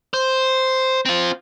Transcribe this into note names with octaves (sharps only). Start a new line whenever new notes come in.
C5
C4 F4